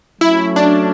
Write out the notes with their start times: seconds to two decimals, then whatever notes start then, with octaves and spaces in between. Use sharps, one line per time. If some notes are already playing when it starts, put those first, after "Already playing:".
0.21 F#3 A3 C#4 E4
0.56 D4